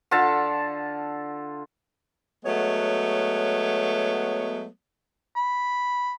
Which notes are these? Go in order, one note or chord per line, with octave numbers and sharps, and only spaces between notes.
D3 F4 A4 A5
F#3 G#3 A3 B3 C#5
B5